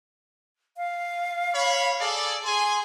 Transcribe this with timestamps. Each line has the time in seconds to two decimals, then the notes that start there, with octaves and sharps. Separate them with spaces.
0.77 F5
1.54 C#5 B5
2.00 G#4 A4 D5
2.44 G#4 G#5 C6